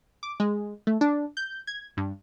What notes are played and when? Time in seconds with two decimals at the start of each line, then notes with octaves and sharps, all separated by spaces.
0.23 D6
0.40 G#3
0.87 A3
1.01 D4
1.37 G6
1.67 G#6
1.97 G2